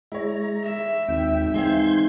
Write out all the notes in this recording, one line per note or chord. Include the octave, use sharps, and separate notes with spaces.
G#3 E4 C#5 A#5
E5
G#1 D#2 G5
G#2 E3 C4 F5 C6 G6 G#6